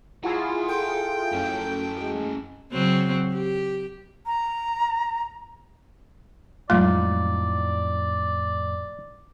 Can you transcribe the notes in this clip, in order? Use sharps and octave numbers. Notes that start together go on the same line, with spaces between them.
E4 F4 G#4 F#5 A#5
A4 G5
F#2 C#4 E4
G#3
C#3 F#3 C4
G4
A#5
F2 A2 F#3 G#3 A3 D#4 F4 D5